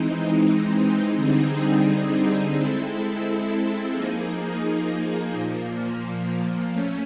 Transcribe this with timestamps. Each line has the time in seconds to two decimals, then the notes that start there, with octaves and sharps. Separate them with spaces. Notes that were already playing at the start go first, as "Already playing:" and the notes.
Already playing: E3 G#3 C4 D#4
1.15 D3 G3 C4 D#4 G#4
2.54 G#3 C4 E4 A4
3.94 F3 A#3 D#4 G#4
5.33 A#2 F3 A#3
6.72 A3 C#4